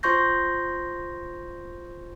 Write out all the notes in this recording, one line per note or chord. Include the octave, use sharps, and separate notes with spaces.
F4 C5 C6 C#6 G6 A#6